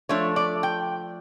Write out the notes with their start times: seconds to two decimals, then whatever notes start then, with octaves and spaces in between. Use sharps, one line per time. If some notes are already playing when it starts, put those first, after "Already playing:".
0.09 F3 A3 D4 C#5
0.36 D5
0.63 G5